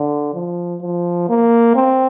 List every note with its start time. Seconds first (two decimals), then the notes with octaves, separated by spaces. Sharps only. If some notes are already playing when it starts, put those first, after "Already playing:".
Already playing: D3
0.34 F3
0.82 F3
1.29 A#3
1.76 C4